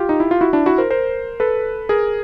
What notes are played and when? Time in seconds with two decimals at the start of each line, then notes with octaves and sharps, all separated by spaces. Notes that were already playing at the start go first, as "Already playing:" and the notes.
Already playing: F4 G4
0.09 D#4
0.20 E4
0.31 F4
0.41 E4 F#4
0.53 D4 E4
0.66 E4 F#4
0.78 A#4 C5
0.90 A#4 C5
1.40 A4 B4
1.89 G#4 A#4